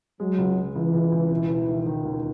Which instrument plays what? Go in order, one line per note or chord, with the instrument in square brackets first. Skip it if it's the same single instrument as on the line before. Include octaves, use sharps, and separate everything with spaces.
[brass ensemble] F#3 [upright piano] G#3
[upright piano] C#2
C#2
[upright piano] C#2 [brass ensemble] E3
[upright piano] C#2
C#2
E1
E1
D#3
D#3
D#2